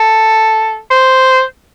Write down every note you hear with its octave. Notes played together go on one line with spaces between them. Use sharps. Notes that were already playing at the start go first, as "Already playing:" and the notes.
Already playing: A4
C5